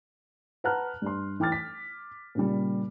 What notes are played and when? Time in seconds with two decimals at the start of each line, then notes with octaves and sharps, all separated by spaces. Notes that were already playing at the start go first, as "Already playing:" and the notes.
0.64 B4 F#5 A5 A#5 F6 F#6
1.02 G2 C6
1.40 E3 G5 D6 F6 A6
1.52 B6
2.35 A#2 C#3 G3